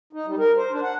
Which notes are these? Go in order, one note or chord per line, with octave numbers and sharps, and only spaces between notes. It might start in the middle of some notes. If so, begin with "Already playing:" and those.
D#4
G3
A#4
C5
D4
F#5